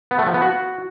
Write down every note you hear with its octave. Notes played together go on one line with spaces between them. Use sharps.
B3
A3
F3
B3
F#4